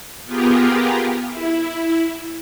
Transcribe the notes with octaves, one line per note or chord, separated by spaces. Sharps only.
B3 F4 G4 G#4 A#4
E4